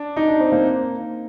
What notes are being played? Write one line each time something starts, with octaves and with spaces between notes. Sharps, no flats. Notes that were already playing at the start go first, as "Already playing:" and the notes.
Already playing: D4
D#4
D4
C4
A#3